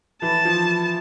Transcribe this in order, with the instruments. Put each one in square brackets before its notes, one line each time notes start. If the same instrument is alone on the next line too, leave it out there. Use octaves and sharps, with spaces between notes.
[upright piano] E3 [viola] A5
[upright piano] F3